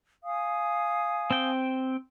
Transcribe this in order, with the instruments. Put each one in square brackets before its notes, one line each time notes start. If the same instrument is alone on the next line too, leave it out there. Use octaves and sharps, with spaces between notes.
[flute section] F5 G#5 D#6
[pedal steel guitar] C4 G5